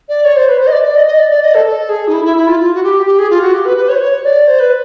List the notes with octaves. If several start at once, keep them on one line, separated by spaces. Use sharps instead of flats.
D5
C#5
C5
B4
C5
D#5
D5
D5
D#5
D#5
D5
D5
D#5
A4
A4
G#4
D#4
E4
E4
E4
F4
F4
F#4
G4
G4
G#4
F4
F#4
G4
B4
B4
C#5
C5
C#5
D5
C5
B4